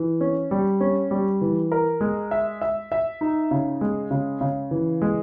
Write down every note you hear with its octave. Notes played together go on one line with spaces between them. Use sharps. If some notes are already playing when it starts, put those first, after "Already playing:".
Already playing: E3
C#4
G3
C#4
G3
E3
A#4
G#3
E5
E5
E5
D#4
C#3
G#3
C#3
C#3
E3
G#3